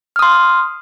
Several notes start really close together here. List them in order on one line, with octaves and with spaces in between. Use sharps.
F6 D#6 C6